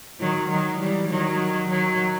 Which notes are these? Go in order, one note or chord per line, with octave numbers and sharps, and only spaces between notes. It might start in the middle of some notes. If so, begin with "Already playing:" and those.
D#3 F#3
D#3 F#3
E3 G3
D#3 F#3
D#3 F#3